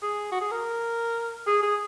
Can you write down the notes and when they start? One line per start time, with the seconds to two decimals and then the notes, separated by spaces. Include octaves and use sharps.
0.02 G#4
0.32 F#4
0.41 G#4
0.51 A#4
1.47 G#4
1.63 G#4